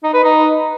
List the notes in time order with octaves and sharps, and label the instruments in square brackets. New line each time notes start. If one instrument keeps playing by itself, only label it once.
[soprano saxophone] D#4
B4
D#4